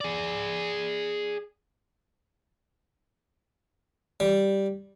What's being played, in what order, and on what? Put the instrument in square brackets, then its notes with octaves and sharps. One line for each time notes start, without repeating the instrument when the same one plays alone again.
[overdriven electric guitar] G#4 D5
[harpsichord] G3